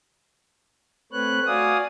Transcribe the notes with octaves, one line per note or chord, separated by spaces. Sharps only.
A3 C4 B4 C#5 F#6
F#4 D5 F5 G#5 D#6